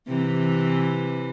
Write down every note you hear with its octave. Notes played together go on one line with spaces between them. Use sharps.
C3 E3